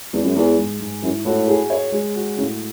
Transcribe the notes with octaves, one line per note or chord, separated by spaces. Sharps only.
E2 G#3
F#2
E2 G#4
G#2
G#2
F#2 E3
A2 F#4
G#4
C#5
G#3
F#4
A2 C#3